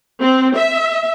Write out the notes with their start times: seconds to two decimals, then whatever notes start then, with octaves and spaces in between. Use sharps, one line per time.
0.22 C4
0.56 E5